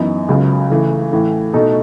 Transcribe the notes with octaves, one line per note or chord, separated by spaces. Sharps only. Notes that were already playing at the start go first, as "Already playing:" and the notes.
Already playing: F#2 E3 B3 D#4
C#2 C#3 F#3
C#3 E3 A3
A2 E3 A3
B2 A3 D#4 A4